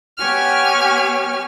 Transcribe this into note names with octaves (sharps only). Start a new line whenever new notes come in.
B3 G4 C#5 G#5 F6